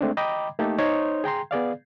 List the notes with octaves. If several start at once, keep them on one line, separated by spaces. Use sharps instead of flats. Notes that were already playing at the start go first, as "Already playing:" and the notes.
G#3 A3 C4 D4
D#5 G5 A#5 B5 D6
A3 A#3 D#4 G4 A4
D#4 C5 C#5 C6 C#6
G#4 G5 A#5 C6
B3 G#4 D5 F5